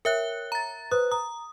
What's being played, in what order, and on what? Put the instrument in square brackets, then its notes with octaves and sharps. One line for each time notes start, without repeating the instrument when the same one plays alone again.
[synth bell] A#4 E5 F#6 [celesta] C#5 G5
[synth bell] A#5 A6
[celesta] B4 C5 F#6 [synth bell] D#6
[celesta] A#5 [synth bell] D#6